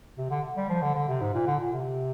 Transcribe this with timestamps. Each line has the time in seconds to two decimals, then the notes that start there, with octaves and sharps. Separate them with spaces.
0.18 C3
0.31 D3
0.57 G3
0.69 F3
0.82 D3
0.95 D3
1.08 C3
1.20 G#2
1.34 A#2
1.47 D3
1.60 A#2
1.72 C3